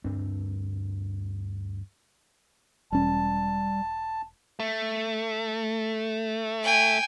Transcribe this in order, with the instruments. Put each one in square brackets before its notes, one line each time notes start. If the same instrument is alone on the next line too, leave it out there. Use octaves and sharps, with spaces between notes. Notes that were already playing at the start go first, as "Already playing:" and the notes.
[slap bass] D2 G2 C4 D4
[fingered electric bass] E1 C#4 [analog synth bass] G3 [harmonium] A5
[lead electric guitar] A3
[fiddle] G5 G#5